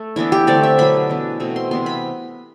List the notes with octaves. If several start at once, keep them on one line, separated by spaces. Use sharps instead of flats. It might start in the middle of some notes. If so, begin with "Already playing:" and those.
Already playing: A3
E3 B3 D4 E4
G4
D3 A3 C4 D5
E5
B2 F#3 B3 D4 B5
E3 B3 D4
B2 A3 C4
C6
C3 E3 B3 C6
B5